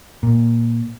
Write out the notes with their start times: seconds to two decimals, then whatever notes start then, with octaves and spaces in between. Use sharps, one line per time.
0.23 A#2